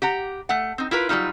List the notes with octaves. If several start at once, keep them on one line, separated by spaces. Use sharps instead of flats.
G4 F#5 A#5
A3 F#5
C4 D#4
E4 F4 A#4 B4
F#3 G3 A3 D#4 F4